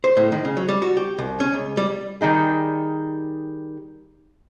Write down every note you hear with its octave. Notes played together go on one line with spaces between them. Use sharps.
C5
A2
D#3
C#3
F#3
G3
F#4
G4
C2
C#4
C#2
G3
D#3 G3 D#4 G#4